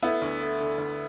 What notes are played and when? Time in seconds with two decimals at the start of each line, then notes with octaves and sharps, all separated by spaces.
0.02 A3 B3 E4
0.22 D2
0.41 A3
0.60 D3
0.78 D2